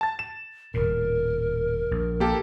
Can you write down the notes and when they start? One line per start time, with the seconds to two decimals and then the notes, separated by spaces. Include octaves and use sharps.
0.01 A5 A6
0.19 E7
0.74 D#1 A2 A#4
1.91 A#1
2.20 A#3 G4 A4